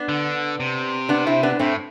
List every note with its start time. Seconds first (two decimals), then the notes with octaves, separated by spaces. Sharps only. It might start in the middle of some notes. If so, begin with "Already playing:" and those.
Already playing: B3 D4
0.09 D3
0.60 C3
1.09 B3 D4
1.27 C4 E4
1.43 B3 D4
1.59 A2 A3 C4